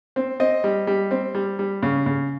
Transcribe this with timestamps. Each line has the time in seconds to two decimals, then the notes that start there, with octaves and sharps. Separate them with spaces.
0.16 C4
0.40 C4 D#5
0.64 G3
0.87 G3
1.11 C4
1.35 G3
1.59 G3
1.83 C#3
2.06 C#3